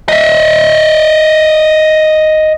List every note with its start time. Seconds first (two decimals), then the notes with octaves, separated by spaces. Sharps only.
0.09 D#5 E5